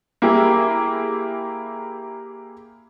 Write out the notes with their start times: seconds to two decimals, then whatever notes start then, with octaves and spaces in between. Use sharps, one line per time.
0.22 A#3 E4 G4 G#4